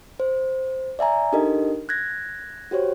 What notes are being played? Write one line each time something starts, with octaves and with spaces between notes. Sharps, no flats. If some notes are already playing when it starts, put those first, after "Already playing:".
C5
D5 E5 G#5 A#5
D4 D#4 G4 A4 A#4 D#5
F#6 G#6 A#6
F#4 G4 C5 C#5